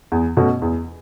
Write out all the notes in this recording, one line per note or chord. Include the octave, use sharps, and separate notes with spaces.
E2
B2 A3 C#4 F#4
E2